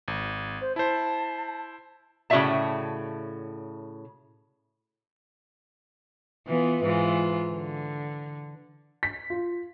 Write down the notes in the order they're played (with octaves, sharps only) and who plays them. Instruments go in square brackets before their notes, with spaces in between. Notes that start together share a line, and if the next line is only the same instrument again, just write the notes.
[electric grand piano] G#1
[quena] C5
[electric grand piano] E4 C5 [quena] A5
[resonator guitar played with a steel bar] A2 C#3 F#4 D5 E5 A5
[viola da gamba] E3 B3 F4
G#2 E3 F4
D3
[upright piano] B6
F4